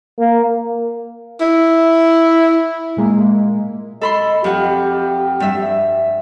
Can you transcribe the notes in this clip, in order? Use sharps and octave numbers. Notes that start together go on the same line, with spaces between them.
A#3
E4
A#2 G#3 A#3
A4 D#5 B5 C6
F2 G4 F#5
G2 E5